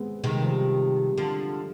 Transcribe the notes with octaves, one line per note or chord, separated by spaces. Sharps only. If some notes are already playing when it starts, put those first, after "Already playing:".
Already playing: G#3 B3 C4
C3 D#3 G#3
G3
F3
G3
D3 F3